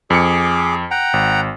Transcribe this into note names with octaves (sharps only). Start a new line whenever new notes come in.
F2 G#4 D6 C#7
F#5 G5 A#5
G#1